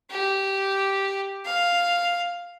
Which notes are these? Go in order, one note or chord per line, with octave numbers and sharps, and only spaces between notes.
G4
F5